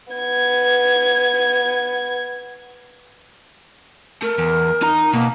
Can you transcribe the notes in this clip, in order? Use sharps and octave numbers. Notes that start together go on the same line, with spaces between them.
B3 G#6
A3 A#4
E2
D#4 A#5
B2 A#3